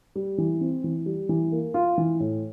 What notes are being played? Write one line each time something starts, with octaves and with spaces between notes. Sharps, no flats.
G3
E3
C4
E3
G3
E3
A#3
F4
E3
A2